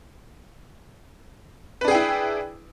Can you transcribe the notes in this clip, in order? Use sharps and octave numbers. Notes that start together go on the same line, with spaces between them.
D4 E4 G#4 B4 G5